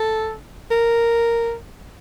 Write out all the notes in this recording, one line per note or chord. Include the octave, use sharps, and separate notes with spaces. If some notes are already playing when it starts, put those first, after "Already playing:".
Already playing: A4
A#4